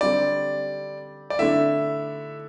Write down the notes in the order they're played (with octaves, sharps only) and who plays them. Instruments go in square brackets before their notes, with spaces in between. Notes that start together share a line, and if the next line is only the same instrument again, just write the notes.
[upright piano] D3 G3 C4 G4 [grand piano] D5
[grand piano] D5
[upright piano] D3 A3 E4 [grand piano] E5